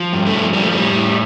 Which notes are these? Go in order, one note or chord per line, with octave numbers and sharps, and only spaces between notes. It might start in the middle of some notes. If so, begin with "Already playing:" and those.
Already playing: F3
G2
A3
F3
F3 G3
A3
A2 G3
A2